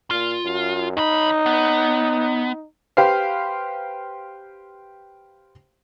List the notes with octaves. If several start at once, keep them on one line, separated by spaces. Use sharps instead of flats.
A#2 F4
F#2
E2 D#4 B5
B3
G4 B4 C5 F5